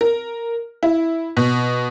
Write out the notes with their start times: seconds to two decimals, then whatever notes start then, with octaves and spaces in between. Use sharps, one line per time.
0.01 A#4
0.83 E4
1.37 B2